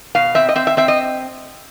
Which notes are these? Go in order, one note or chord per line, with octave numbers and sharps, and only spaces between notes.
B2 F5
C4 E5
D#5
C4 E5
E5
C4 E5
D#5